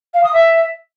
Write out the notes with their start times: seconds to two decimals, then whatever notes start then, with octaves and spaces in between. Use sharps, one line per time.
0.14 F5
0.23 D#6
0.33 E5